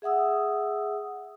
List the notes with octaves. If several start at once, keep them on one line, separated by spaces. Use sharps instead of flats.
G#4 E5 F#5 D#6 E6